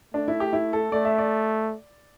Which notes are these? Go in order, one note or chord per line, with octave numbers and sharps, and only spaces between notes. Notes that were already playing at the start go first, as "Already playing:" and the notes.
A3 D4
E4
G4
E4
A4
A3 D5
E5
D5